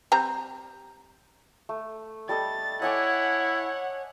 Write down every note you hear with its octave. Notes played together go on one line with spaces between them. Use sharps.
G3 C4 A#5
A3
G3 A4 D#5 A6
E4 C#5 D#5 F#5 G#5 D6